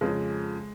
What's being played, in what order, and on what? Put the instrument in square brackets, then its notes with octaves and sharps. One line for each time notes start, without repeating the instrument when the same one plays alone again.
[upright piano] F2 C#3 F3 G#3